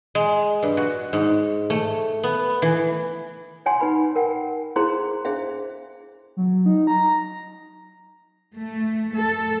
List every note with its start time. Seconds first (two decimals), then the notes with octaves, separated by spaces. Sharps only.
0.15 G#3
0.63 G2
0.77 F#4
1.13 G#2
1.70 A3
2.23 B3
2.62 E3
3.66 C#5 F#5 G#5 C6
3.80 D#4 B4 B5
4.16 A#4 F#5 G5
4.76 E4 G#4 C5 F5 A#5 C6
5.25 D4 G#4 C5 E5 F5
6.37 F#3
6.66 D#4
6.87 A#5
8.55 A3
9.14 A4